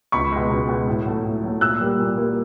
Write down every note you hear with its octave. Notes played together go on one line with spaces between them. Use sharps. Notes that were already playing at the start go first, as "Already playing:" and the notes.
C#2 B5 C#6
B2 G#3
C#2
B2 G#3
A2
F#3 A3
A2
F#3 A3
A#2 E6 F#6
G3 A#3
A#2
G3 A#3